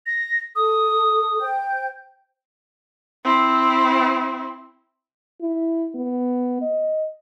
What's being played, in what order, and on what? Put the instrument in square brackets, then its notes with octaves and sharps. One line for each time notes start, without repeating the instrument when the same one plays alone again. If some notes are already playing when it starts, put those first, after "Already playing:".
[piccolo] A#6
[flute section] A4 [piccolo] D#6
[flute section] C5 G5 G6
[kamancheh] C4 E4
[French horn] E4
B3
D#5